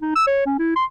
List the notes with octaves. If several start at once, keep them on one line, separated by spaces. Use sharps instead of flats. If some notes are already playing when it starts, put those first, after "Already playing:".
D#4
E6
C#5
C#4
E4
C6